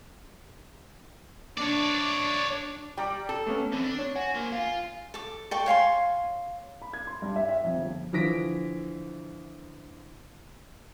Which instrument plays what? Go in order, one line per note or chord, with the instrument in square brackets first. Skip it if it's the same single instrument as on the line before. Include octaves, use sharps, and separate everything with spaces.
[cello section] D4 [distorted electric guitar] C#5 D5
[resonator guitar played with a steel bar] G3 [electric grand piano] G5 A#5 D6
[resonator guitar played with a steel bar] A4
[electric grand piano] A3 B3 C#4
[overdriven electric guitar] D3 E3 [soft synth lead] C4
[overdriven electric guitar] D4
[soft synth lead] C#5
[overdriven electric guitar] F#4 [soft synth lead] G#5
[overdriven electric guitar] A#3 C5
F4
[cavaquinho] A4 D6
A4 D5 G5 C#6
C#5 F5 G#5 C6
[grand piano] B5
G#6
C6
G2
E5
E5
F2
G1
D3 E3 F3 A#6 B6 D7